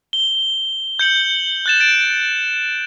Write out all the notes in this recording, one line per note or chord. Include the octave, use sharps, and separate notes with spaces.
G7
G6 C#7 F#7
F#6 A6 E7
A6 D7
D7